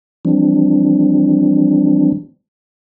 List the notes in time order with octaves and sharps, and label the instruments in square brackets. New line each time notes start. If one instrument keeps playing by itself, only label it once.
[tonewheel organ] E3 F3 G3 C4 D4